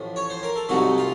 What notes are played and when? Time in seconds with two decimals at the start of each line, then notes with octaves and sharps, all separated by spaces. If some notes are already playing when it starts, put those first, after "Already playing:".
Already playing: A1 A2 F3
0.16 C#5
0.30 C5
0.43 A#4
0.56 A4
0.69 C2 C3 F#3 A3 D#4 F#4
0.98 F4